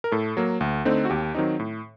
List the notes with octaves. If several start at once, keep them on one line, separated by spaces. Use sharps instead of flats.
A#4
A2 A4
F#3 A#3
D2
D3 A3 C4 D#4
F#4
D#2 G4
D#3 F#3 C4 D#4
A2